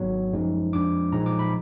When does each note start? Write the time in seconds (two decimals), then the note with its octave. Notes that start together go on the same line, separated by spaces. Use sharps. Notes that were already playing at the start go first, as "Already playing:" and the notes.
Already playing: G#1 G#2 F#3 B3
0.33 F#2 F3 G#3 D#4
0.73 F2 F3 G#3 D4 D6
1.12 B1 A#2 F3 G#3 D#4 A#5
1.26 D6
1.39 B5